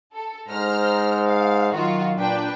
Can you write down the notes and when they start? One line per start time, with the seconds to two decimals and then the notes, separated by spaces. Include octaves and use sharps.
0.12 A4
0.48 G#2 C5 A#5 F6
1.27 F5
1.73 D#3 F#3 F4 F#4
2.16 A#2 D4 B4 G5